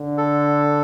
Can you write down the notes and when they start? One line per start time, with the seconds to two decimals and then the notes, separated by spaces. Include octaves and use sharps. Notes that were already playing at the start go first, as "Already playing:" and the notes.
Already playing: D3
0.18 A4